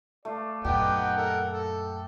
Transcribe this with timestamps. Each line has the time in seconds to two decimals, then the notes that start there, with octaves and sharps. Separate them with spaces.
0.25 A3 D5 F5
0.65 F#2 A#2 B3 D#4 G4 F#5 G5
1.17 A4 A#4
1.50 A4